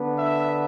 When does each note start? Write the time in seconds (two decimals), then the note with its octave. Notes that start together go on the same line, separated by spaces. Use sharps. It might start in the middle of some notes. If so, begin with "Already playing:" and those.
Already playing: D3 B3 D4
0.17 E5